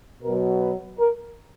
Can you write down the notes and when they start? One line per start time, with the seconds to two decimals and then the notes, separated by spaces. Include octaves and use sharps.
0.22 B2 F#3 A#4
0.59 B4
0.97 A#4